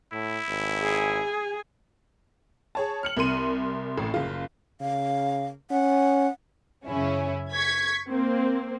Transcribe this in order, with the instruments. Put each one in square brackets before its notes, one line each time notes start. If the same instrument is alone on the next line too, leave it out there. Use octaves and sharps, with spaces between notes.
[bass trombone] A2 [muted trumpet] E4
[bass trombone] G#1
[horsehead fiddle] G#4 [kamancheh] G#5
[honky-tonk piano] G#4 C#5 A5
F6 C#7 F#7
C2 A#4 C6 D#7
A1 A2
F#1 F4
[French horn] C#3 [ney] F5
[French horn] C#4 [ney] F#5
[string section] F#2 C#3 C#4 E4
C#6 G#6 B6
A#3 C4